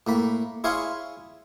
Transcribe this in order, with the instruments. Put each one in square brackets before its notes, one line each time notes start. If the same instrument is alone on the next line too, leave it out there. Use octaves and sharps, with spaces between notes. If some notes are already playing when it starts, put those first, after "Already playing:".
[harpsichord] A2 A#3 B5
E4 G#4 C#5 F5 G#5 C6